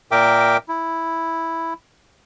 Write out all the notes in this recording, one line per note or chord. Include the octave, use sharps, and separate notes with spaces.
A#2 A#4 E5 G5 D6
E4